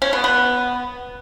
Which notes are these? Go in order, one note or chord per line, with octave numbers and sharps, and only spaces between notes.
C#4
B3
B3